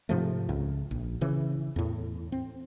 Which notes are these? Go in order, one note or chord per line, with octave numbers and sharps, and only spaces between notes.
G#2 C3 F3 A3
C#2
A#1
C#3 E3 C#4
E2 A2
C4